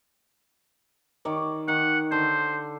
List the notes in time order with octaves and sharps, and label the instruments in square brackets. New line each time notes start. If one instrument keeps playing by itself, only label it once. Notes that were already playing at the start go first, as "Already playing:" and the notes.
[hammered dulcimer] D#3 C#5 D5
[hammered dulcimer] D#3 [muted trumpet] F#5
[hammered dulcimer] D3 [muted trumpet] C5